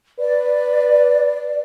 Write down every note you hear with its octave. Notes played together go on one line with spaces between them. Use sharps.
B4 D5